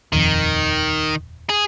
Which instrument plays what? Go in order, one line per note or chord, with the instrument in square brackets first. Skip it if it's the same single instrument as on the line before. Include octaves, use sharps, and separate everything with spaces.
[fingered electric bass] D#1 F2 [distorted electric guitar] D#3
[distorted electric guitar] G#4